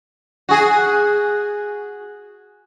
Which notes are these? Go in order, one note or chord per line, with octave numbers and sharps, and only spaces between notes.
F#4 G#4